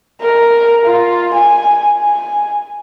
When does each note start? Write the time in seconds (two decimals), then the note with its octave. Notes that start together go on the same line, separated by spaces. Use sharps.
0.21 A#4
0.85 F4
1.34 G#5
1.99 G#5